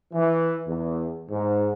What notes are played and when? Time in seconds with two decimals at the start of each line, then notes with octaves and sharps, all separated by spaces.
0.12 E3
0.67 E2
1.29 G#2